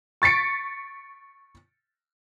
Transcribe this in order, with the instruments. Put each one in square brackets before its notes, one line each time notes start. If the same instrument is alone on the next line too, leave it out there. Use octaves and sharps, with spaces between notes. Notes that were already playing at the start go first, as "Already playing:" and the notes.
[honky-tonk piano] C#6 A6 B6 C#7 D7